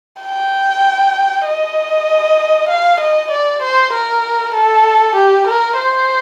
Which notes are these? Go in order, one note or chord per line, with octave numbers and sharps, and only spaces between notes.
G5
D#5
F5
D#5
D5
C5
A#4
A4
G4
A#4
C5